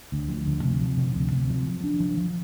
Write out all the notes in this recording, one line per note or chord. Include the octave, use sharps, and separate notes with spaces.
D2
F3
D2
C3
F3
C3
D2
C3
F3
F3
D4
F3
F3